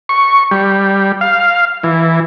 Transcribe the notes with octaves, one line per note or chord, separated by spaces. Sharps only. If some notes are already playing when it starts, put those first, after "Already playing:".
C#6
G3
F5
E3